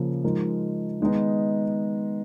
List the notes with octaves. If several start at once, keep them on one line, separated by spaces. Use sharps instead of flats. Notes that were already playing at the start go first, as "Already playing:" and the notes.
Already playing: C#3 F3 A#3
F3 G#3 D#4 A#4
D#3 G#3 B3 D#4